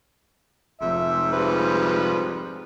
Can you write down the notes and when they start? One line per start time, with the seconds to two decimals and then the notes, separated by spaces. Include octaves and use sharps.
0.81 F1 F2 G#2 E5
1.32 F3 G3 B4